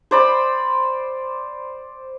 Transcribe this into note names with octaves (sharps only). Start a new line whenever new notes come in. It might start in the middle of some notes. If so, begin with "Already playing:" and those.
C5 D5 B5